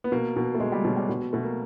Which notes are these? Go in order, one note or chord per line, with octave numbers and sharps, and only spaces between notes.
B3
B2 A#3
B2
A3
B2 G#3
G3
B2 F#3
G3
B2
B2 A3
A#3